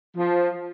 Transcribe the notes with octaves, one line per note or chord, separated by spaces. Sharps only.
F3